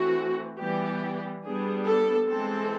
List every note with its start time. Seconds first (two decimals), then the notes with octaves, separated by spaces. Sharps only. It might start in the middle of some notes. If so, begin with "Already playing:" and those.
Already playing: E3 A3 C4 F#4
0.59 E3 G3 B3 G4
1.44 G3 B3 D4 G#4
1.86 A4
2.28 E3 G#3 C4 A4